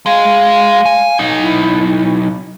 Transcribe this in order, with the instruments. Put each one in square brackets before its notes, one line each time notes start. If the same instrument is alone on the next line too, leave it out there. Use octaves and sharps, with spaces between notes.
[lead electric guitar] G#3 G#4 [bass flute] F5
[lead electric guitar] G#5
B1 D#4
[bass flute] E4